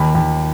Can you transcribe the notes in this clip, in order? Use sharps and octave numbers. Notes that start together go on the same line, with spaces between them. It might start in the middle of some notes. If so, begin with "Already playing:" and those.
Already playing: D#2 B5
D#2